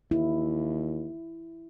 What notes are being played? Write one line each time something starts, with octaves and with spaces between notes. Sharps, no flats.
D#2 E4